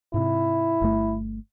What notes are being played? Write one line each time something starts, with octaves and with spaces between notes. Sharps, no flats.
G#2 C3 E4
G1 G2 A3